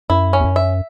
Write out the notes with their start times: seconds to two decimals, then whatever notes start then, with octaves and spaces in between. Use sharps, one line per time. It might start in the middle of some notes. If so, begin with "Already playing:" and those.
0.10 F#2 E4
0.33 C#4
0.40 E2
0.44 F#2
0.56 E5